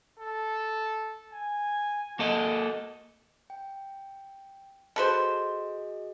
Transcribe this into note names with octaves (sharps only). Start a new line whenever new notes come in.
A4
G#5
A#3 F#4 A4 D#5
G5
F#4 G#4 A4 B4 C5 D#5